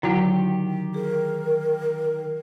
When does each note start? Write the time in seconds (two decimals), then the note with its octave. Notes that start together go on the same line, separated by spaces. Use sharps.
0.03 D3 D#3 F#3 E4 F#4 G4 F#5
0.94 G#4 A#4